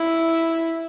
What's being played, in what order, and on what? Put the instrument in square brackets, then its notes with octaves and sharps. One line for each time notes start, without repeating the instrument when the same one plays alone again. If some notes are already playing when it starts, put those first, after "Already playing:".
Already playing: [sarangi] E4